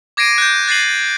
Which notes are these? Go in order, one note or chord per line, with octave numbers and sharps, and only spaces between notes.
D6 G#6 A#6 C7 D7 D#7
F#6 G6
F#6 A6 A#6 C7 D#7 F#7